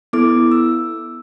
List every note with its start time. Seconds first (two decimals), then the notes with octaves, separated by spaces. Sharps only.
0.13 B3 E4 A4 D6
0.52 E6